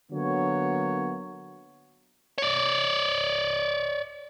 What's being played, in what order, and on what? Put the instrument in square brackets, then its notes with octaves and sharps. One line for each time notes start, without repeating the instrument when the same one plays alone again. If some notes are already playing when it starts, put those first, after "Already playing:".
[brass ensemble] D3 F#3 A#3 B3 F#4 C#5
[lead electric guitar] C#5 D5